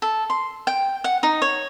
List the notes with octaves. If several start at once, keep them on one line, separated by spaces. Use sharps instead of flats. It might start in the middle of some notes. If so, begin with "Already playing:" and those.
A4
C6
G5
F#5
D#4
C#5